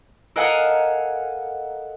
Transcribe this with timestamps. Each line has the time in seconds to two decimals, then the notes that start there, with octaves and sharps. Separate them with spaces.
0.36 A4 A#4 D#5 F5 F#5 G#5